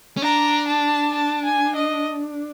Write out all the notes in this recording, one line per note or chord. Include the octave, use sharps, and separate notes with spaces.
C#4
D4 A#5
A5
A5
G#5
D#5